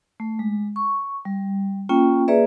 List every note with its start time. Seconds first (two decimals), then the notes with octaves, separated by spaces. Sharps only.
0.20 A3
0.39 G#3
0.76 C#6
1.25 G3
1.89 A#3 C#4 F4 G5
2.28 A#3 G#4 B4 D5 E5